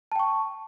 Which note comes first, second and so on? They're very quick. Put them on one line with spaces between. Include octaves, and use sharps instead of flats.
A5 G5 C#6